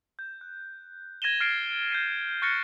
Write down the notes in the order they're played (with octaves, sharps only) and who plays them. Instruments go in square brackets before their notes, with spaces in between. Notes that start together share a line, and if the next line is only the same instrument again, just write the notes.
[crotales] G6
F#6
G#6 A#6 D#7 E7 G7
F6 A6 C7 D7
G6 A#6 C7 D#7
C#6 F6 F#6 A6 A#6 C#7